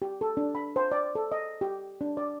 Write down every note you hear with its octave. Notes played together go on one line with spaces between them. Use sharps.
G4
A4
D4
B5
C5
D5
A4
D#5
G4
D4
D5